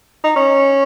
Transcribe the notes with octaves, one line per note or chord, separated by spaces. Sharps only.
D#4
C#4